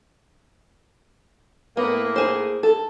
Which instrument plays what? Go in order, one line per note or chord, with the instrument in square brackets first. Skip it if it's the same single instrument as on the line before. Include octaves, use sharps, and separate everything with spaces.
[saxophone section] A2 A#3 [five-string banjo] B3
[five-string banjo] G#4 C5
A4